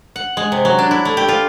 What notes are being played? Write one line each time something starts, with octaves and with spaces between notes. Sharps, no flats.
F#5
G#3
C3
F#3
D4
E4
A3
G4
F4